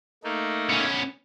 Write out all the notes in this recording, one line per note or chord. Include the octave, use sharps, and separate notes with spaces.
A3 A#3 D#4
B3 C#4